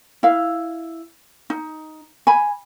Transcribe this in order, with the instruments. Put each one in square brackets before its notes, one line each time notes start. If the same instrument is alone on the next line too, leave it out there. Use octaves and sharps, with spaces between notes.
[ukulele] E4 F5
D#4
G#5 B5